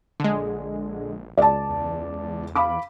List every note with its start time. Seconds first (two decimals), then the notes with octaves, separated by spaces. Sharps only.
0.20 A#1 D3 G#3
1.38 C#2 D5 A5
1.69 E2
2.55 F5 B5 D6